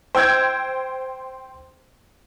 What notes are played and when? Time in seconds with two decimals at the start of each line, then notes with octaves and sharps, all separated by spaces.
0.15 C5 G5 E6 G6 G#6